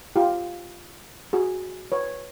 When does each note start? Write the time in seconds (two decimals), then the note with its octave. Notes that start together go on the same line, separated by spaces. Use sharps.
0.16 F4 G4
1.33 F#4 G#4
1.92 B4 C#5